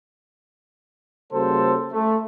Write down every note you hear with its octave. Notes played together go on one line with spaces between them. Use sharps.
C#3 G3 A#3 F#4 A4 C5
A3